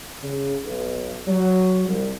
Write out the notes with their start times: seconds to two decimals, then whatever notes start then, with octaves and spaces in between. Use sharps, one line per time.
0.23 C#3
0.64 B1
1.27 F#3
1.88 C2